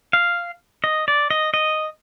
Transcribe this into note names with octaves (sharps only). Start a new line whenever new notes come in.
F5
D#5
D5
D#5
D#5